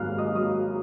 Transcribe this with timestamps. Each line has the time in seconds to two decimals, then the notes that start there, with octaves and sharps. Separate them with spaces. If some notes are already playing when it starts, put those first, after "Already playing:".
Already playing: G#1 G#2 F#3 A#3 F5 F6 F#6
0.18 D#5 D#6
0.35 F#3 D#6